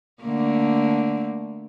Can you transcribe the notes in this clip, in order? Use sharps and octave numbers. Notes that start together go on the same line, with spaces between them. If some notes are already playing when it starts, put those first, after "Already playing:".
D3 A3 A#3